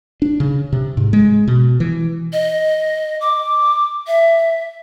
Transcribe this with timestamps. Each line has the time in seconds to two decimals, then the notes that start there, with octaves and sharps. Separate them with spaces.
0.22 D4
0.40 C#3
0.73 C3
0.97 G#2
1.13 G#3
1.48 B2
1.80 E3
2.32 D#5
3.21 D6
4.07 E5